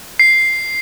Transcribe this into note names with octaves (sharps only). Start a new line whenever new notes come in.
C7